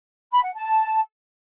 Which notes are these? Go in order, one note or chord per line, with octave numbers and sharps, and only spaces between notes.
B5
F#5
A5